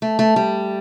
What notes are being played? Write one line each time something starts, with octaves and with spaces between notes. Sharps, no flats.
A3
A3
G3